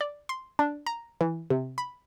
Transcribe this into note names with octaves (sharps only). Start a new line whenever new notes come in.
D5
C6
D4
A#5
E3
C3
B5